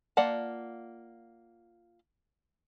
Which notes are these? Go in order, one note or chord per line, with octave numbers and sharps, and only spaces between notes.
A#3 F4 D5 F#5 A5